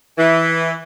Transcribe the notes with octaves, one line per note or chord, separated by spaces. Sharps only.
E3